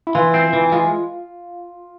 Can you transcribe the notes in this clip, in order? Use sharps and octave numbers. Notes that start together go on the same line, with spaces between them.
E4
E3 F4
C4
E3
G#3 F4